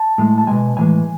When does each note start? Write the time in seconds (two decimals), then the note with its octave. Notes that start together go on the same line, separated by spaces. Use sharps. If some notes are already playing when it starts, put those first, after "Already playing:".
Already playing: A5
0.18 A2 G#3
0.38 A5
0.47 B2 G#3 G#5
0.76 A2 E3 G#3 G#5